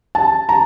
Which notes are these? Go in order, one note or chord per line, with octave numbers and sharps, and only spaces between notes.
A5
A#5